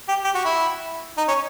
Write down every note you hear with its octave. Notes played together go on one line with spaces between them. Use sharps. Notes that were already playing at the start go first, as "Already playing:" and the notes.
G4
G4
F#4
E4
D#4
C#4